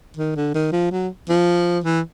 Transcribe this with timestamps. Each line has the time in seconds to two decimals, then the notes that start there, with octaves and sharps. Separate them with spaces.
0.17 D#3
0.36 D3
0.54 D#3
0.72 F3
0.91 F#3
1.29 F3
1.84 E3